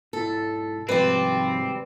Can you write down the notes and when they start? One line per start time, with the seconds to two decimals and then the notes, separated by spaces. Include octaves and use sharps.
0.13 B1 G#2 E4 A4
0.89 G#1 G#2 C3 F3 G3 C4 B4 D5